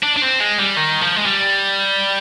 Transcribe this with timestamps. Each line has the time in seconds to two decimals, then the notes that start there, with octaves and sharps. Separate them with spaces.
0.03 D4
0.17 D4
0.22 C4
0.40 G#3
0.59 G3
0.77 D#3
1.01 F3
1.16 G#3
1.26 G3